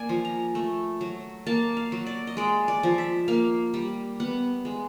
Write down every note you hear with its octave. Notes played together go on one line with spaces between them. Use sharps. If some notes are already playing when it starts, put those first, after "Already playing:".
Already playing: A#3 D5 G#5
F3
A#5
A3
F#3
A#3 A5
F5
F#3
D5
D#5
G#3 D5
D5
F3
E5
A#3 F5
G3
B3 F#5
G#3